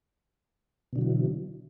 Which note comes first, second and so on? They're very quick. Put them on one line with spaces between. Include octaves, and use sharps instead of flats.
B2 D3 F#3 E3